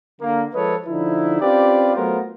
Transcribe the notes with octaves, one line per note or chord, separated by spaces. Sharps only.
D3 A#3
F3 G#3 A4 B4 C#5 D#5
D3 F3 D#4 E4
C4 C#4 F4 G4 B4 D5
F#3 A3 B3 F4 A#4 C5